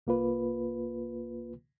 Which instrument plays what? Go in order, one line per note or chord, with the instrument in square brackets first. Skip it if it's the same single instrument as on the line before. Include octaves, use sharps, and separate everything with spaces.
[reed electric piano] C2 A#3 F4 B4